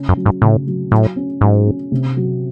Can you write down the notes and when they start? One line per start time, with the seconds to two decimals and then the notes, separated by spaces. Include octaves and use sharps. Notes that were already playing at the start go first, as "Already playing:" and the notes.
Already playing: C#3 C#4
0.09 F#2
0.17 F#3
0.26 G#2
0.42 A2 C#3
0.67 F#3
0.91 A2 F#3
1.16 C#4
1.41 G#2 F#3
1.67 C#4
1.92 C3
2.16 F#3